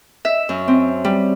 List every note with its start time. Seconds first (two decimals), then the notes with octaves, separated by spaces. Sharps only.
0.25 E5
0.49 F#2
0.68 C4
1.04 G3